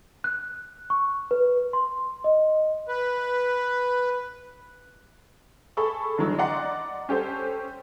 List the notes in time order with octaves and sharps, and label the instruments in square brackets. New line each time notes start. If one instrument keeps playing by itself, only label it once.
[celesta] F#6
C#6
B4
C6
D#5
[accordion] B4
[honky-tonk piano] G#4 A4 B5 C#6 E6
F#1 D3 E3 F#3
D5 D#5 F#5 A#5 C6
C#4 G4 A4 C5